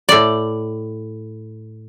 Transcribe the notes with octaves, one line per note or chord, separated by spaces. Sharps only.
A2 D5